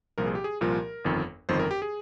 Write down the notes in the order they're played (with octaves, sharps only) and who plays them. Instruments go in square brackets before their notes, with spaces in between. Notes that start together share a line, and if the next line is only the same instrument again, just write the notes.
[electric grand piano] C2 A#2 F3 A#4
G#4
G4
G#4
C2 A#2 F3 A#4
G1 F2 D#3
G1 F2 D#3 C5
A#4
G4
G#4